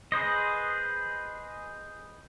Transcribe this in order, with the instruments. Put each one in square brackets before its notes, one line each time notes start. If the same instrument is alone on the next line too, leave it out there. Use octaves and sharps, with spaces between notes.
[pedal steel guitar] G#4 B4 C5 D#5